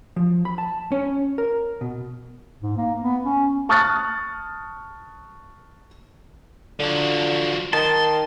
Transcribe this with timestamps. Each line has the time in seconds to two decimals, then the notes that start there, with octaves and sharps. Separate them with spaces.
0.16 F3
0.45 B5
0.58 A5
0.92 C#4
1.38 A#4
1.81 B2
2.62 G#2
2.77 A#3
3.02 B3
3.24 C#4
3.69 A5 C#6 D#6 F6 F#6 A6
6.79 D3 F3 F#3
7.73 D#3 A5 C6